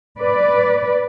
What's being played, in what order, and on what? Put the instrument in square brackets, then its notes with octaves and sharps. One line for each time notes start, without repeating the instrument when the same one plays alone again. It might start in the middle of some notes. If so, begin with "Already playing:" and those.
[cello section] B4 D5